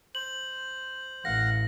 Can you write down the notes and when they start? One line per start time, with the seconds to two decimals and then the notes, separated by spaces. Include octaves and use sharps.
0.15 C5 F#7
1.25 A1 F5 F#5 A#6